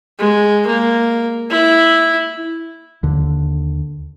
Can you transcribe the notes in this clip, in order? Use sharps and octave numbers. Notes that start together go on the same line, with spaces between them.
G#3
A#3
E4
D#2 D3